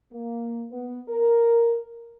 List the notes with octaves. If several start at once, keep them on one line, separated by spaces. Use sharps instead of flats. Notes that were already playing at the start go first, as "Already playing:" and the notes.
A#3
B3
A#4